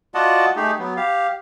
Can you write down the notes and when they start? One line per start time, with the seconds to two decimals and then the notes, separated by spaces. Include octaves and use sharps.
0.15 F4 F#4 D5 D#5 F#5 A5
0.56 A3 D#4 G4 G#4
0.79 F#3 B3
0.97 G4 F5